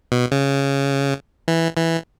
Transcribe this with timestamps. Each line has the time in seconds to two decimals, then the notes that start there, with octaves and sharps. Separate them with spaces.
0.12 B2
0.32 C#3
1.48 E3
1.77 E3